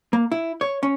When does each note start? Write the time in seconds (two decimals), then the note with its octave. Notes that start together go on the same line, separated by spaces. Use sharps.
0.13 A#3
0.32 E4
0.61 C#5
0.83 C#4